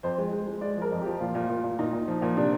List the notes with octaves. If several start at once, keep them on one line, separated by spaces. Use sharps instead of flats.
F2 C5
G#3
G#3
G#3
G#3 D5
F3 A#4
F2
F3 G4
A#2 F4
A#2
A#2
A#2
A#2 D#4
A#2
F3
A#2
C3 D4